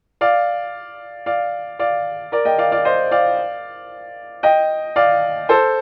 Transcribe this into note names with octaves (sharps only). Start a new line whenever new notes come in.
D5 F5
D5 F5
D5 F5
A#4 D5
D#5 G5
D5 F5
D5 F5
C5 D#5
D5 F5
D#5 G5
D5 F5
A4 C5